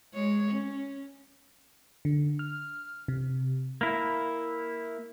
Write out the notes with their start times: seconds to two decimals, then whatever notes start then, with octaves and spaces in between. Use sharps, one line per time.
0.14 G#3 C#5
0.50 C#4
2.05 D3
2.39 F6
3.08 C3
3.81 A#3 E4